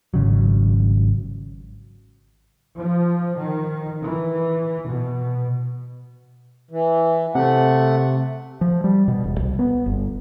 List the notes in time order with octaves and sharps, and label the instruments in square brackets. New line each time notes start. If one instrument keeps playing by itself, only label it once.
[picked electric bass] G#1 C#3 F#3
[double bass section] F3
D#3
E3
B2
[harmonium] E3
[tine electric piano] C3 [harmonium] A3 F#5
[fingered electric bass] F3
G3
B2
E1
C2
B3
G1